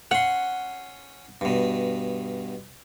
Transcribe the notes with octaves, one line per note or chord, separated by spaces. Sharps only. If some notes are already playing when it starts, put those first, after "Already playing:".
C#4 F#5 C6
G2 B2